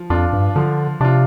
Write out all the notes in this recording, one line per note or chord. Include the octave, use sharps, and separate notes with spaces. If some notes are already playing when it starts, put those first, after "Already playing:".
Already playing: F3
F2 D4 F4
G2
D3 F3
C3 D4 F4